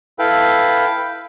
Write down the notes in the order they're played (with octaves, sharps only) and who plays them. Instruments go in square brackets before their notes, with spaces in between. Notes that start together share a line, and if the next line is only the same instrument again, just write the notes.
[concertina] E4 A4 B4 F5 G5 B5